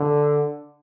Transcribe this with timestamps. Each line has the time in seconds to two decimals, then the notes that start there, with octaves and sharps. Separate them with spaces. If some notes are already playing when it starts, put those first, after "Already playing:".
Already playing: D3